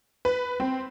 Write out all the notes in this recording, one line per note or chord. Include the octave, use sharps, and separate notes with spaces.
B4
C4